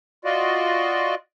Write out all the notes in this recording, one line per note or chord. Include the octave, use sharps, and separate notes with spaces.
F4 F#4 D5 D#5